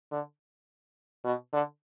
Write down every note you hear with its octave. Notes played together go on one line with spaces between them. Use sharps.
D3
B2
D3